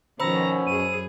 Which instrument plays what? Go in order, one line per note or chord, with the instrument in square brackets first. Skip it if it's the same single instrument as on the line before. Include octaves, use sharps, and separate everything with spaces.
[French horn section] B2 C#4 [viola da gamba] D#3 F3 [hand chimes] C5 B5 E6 [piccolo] A#5
[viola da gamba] F#2 G#4 [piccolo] D#7